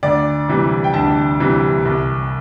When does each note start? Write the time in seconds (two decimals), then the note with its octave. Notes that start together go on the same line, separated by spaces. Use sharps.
0.03 D2 D5
0.49 C3 E3 G3
0.84 G5
0.94 D2 A5
1.40 C3 E3 G3
1.85 C2